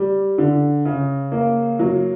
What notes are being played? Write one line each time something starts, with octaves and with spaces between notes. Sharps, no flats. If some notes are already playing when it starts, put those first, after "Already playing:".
Already playing: G3
D3
C#3
A#3
F#3